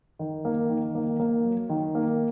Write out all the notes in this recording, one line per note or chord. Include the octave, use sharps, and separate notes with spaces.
D#3
A#3
D#3
A#3
A#3
F#3
D#3
A#3